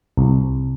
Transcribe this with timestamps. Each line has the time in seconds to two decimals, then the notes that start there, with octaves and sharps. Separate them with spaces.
0.17 C2